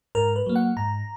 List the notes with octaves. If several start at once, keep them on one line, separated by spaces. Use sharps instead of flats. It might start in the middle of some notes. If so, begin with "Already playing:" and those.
G#2 A#4
B4
F#3 A#3
F#5
G#2 A#5